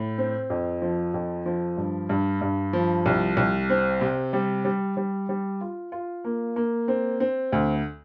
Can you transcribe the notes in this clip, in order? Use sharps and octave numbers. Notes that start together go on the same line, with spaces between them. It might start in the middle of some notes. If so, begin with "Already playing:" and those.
Already playing: A2
C4
F2
F3
F2
F3
G2
G2
G2
F3
C2
C2
C4
C3
G3
G3
G3
G3
F4
F4
A#3
A#3
C4
C4
D2